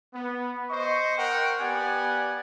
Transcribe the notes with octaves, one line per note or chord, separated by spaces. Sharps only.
B3
C5 D#5 C#6
A#4 F#5 G5
B3 G4 D5 F#5 G#5